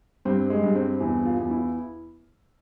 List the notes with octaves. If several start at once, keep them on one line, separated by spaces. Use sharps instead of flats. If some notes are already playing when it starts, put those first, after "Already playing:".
G2 C4
G#3
G2
C4
E2 E4
F4
E2
E4